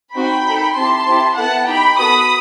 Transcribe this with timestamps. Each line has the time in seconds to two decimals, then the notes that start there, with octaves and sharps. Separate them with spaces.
0.15 C4 D#4 F#4 G5 B5
0.45 D#4 A4
0.76 C4 E4 G4 A5 C6
1.06 C4 E4 G4
1.37 B3 E4 A4 F#5 A5
1.67 D#4 G4 G5 B5
1.98 B3 F#4 A4 B5 D#6